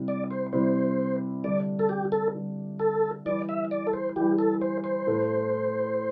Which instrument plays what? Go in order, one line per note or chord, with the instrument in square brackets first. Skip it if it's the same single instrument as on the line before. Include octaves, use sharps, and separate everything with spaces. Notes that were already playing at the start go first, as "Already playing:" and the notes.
Already playing: [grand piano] C3 G3 E4
[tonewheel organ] D5
C5
[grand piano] C3 G3 E4 [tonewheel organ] C5
[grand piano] D3 G3 D4 [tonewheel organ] D5
[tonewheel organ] A4
G4
A4
[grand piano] D3 G3 D4
[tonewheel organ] A4
[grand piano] E3 G3 E4 [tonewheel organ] D5
[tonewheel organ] E5
D5
A4
C5
[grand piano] E3 G3 E4 [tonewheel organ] G4
[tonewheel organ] A4
C5
C5
[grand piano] A2 A3 E4